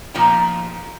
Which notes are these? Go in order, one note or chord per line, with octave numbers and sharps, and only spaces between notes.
A#2 F3 D#4 A4 G5 A#5